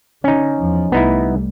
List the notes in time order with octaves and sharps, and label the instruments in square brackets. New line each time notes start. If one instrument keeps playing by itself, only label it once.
[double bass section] D3 [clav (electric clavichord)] C#4 D#4
[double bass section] E2 F3
[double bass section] C2 G3 A3 [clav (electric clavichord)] B3 D#4 E4